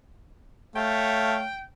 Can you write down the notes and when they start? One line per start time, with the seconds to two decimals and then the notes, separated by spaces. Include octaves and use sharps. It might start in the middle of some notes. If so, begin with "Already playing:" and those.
0.76 A3 C#5 F5 G5